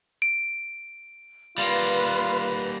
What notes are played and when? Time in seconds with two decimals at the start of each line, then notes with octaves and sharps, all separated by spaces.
0.22 D7
1.58 G3 A#3 F4 B4